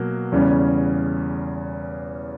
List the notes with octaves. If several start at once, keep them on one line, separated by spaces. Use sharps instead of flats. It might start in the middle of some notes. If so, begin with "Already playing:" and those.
Already playing: B2 F#3 A#3
E2 C#3 G3 C#4